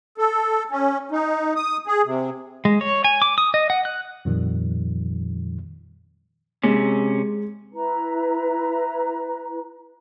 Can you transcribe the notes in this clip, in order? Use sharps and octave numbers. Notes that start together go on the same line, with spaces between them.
A4
C#4
D#4
D#6
G#4
C3
G#3
C#5
G#5
D6
D#6
D#5
F#5
F#6
F2 A#2 D#3 F3 G3
C3 G#3 C#4
E4 B4 A#5